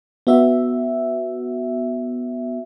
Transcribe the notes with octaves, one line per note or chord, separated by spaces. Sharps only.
B3 F#4 E5